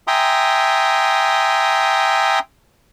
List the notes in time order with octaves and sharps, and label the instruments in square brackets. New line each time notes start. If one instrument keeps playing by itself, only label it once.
[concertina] E5 G5 G#5 A#5 C6 D#6